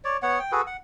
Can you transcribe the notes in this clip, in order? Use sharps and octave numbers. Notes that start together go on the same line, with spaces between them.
C#5 D5
B3 C#5 F#5
G5
F#4 G#4 A4 B4
F#5